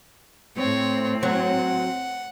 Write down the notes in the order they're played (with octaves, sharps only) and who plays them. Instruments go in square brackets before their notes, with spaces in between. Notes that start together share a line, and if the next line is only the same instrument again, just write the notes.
[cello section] A2 C4 [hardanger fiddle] C#5
[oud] F#3 [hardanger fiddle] F#5